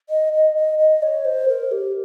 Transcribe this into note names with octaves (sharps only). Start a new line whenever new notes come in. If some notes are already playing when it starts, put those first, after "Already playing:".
D#5
D#5
D#5
D#5
C#5
C5
A#4
G4